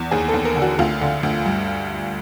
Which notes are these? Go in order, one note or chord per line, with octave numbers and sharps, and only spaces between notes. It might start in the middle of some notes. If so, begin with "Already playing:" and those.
Already playing: E2
D#2 G#4
A4
D#2
A#4
D3
F#4
D2 F4
D3
D2
G2